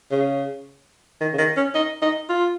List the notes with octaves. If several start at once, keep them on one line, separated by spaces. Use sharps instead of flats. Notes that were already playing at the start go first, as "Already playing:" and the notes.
C#3
D#3
C#3
D#3
C#4
D#4
D#4
F4